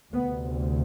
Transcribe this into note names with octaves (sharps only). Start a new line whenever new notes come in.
D2 C3 B3